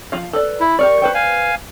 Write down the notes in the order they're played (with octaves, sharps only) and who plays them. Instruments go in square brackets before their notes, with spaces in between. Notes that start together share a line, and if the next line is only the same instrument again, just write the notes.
[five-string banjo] F3 F4 F5
A4 B4 D5
[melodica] E4
[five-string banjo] G4 A#4 D5 [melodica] C#6
[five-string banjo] B4 C5 G5
[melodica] F5 G#5